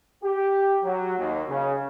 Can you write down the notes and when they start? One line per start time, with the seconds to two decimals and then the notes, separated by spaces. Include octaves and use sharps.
0.23 G4
0.84 F#3
1.18 D#2
1.49 C#3